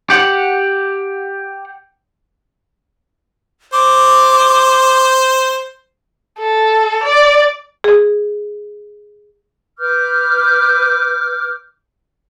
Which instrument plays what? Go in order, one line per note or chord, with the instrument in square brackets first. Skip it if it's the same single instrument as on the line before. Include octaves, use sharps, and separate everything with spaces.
[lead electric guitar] G4 F#5
[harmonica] C5 [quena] D6
[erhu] A4
D5
[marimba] G#4
[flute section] B4 D6 F6 G6